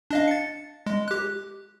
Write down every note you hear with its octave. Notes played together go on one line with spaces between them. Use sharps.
D4 D#5 F5
A6 C#7
G#3
G4 F#6